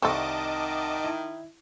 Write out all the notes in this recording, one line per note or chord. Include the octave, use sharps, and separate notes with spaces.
C2 D#3 C4 A4 D#5 A5 C#6 D6
E4